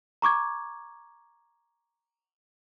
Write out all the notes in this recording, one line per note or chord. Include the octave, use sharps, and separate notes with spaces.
A#5 C#6 D6 G#6